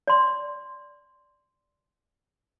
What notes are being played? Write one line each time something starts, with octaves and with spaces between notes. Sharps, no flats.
D5 C6